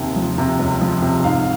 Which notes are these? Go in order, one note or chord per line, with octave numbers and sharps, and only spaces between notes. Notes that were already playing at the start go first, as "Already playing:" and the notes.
Already playing: D#2 C3
F3
C3
C#2
F3
C3
G#2 F5